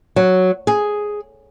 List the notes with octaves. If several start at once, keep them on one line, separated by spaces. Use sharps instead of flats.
F#3
G#4